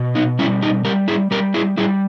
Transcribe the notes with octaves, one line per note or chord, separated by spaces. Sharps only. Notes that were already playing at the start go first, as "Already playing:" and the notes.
Already playing: B2
B3 D#4
G3 C#4 E4
D#4 G4
G3 G4 A#4
E4 G#4
G3 G4 A#4
E4 G#4
G3 E4 G#4